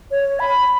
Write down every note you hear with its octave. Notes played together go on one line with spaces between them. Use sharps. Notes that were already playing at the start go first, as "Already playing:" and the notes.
C#5
B5